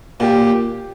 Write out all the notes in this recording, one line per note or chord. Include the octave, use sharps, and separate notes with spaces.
A#2 G4